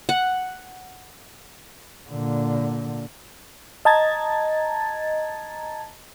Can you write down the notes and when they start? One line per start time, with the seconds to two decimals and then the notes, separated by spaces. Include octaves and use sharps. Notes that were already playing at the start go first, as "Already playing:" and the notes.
0.09 F#5
2.10 A#2 D3
3.85 D#5 A5 A#5 G#6 A6